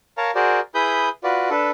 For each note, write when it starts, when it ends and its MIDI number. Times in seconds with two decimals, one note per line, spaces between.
0.18 0.31 70
0.18 0.31 73
0.18 0.31 77
0.18 0.31 81
0.18 0.31 82
0.35 0.60 66
0.35 0.60 68
0.35 0.60 70
0.35 0.60 72
0.35 0.60 74
0.75 1.09 64
0.75 1.09 68
0.75 1.09 71
0.75 1.09 83
0.75 1.09 87
0.75 1.09 91
1.24 1.50 65
1.24 1.50 66
1.24 1.50 71
1.24 1.50 74
1.50 1.71 62
1.50 1.71 69
1.50 1.71 71